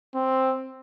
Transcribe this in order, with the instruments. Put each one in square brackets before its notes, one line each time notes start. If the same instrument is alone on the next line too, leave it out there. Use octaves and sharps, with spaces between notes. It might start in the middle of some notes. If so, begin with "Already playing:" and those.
[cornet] C4